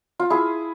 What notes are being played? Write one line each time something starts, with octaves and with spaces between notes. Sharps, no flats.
F4
E4 G#4